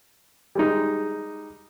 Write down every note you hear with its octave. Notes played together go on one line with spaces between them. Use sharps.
G3 G#3 D#4